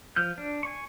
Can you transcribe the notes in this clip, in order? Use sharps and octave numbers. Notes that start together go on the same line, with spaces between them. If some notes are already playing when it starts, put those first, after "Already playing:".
F3 F6 G6
D4
G#5 C#6